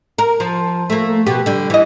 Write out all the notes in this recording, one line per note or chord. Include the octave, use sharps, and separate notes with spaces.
A#4
F3
A3 A#3
B2 B3 G4
D3 G3
E3 D#5